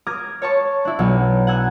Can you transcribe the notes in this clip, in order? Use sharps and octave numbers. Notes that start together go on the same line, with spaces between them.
A#5 D6 D#6 F6 G#6 A#6
C#5 A5 C#6
D4 E4
B1 F#3
F#5 G#5 E6 F#6